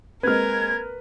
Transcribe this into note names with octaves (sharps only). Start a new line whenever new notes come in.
G#3 A#3 C4 A#4 B4 F6 G#6